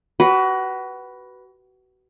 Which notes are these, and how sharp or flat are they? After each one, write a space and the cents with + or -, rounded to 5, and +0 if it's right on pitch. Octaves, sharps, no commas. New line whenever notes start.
F#4 +30 B4 +0